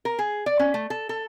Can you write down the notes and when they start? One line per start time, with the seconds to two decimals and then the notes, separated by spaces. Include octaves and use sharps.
0.05 A#4
0.19 G#4
0.46 D5
0.59 C#4
0.74 A3
0.90 A4
1.09 A4